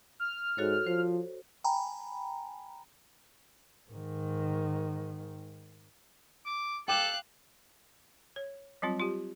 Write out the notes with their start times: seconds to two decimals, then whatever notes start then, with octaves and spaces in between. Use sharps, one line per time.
0.20 F6
0.58 G#2 F#4 A4 C#5
0.87 F3 C5
1.64 G5 G#5 A#5 B5
3.90 G#2 D#3
6.46 D6
6.88 A4 F5 G5 D6 F#6 E7
8.36 C#5
8.82 F#3 G3 C4 F4
8.99 F4 G4